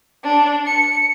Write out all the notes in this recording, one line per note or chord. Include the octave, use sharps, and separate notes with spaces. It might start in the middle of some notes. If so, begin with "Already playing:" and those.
D4
C#7